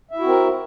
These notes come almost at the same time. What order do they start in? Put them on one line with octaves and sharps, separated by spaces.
E5 E4 F#4 C4 A#4